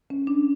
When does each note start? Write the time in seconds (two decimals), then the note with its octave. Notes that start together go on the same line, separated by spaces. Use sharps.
0.10 C#4
0.27 D4